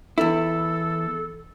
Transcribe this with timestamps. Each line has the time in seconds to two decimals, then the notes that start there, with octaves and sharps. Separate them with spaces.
0.18 E2 E4 A4